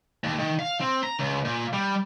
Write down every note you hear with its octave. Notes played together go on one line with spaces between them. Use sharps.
D#2
D#3
F5
C4
A#5
C#2
A#2
G3